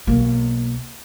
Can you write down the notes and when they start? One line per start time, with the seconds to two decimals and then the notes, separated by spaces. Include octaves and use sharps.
0.07 B1 A#3